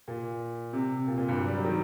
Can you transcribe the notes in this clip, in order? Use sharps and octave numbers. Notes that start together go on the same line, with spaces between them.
A#2
C3
A#2
A#2
G2
F#3
G3
F#3
D#3